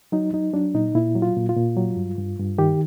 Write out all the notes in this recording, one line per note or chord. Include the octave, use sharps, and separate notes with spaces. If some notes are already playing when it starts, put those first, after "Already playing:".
F#3 D#4
F#3 D#4
F#3 D4
A#2 D#4
A#2 E4
F#3
F4
A#2
F4
A#2
F#3
G2
G2
G2
D#3 G4